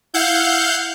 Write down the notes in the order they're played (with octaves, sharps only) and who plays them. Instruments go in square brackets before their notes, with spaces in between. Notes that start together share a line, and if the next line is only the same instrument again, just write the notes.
[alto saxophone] E4 [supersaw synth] F5 F#5 G6